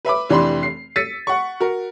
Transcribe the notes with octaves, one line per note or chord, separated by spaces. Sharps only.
B4 E5 B5 D6
F1 E3 D4 G4 B5 C6
C7
E6 A6 B6 C#7 D#7
F#5 C#6
F#4 A#4